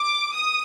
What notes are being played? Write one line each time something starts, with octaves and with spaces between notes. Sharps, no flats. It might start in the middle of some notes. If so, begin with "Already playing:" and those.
Already playing: D6
D#6